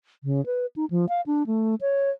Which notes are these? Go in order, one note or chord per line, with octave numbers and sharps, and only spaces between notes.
C#3
B4
D#4
F3
F5
D4
A3
C#5